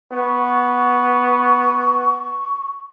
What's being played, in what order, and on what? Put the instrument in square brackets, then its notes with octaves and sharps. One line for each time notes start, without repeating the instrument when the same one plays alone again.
[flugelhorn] B3 [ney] C#6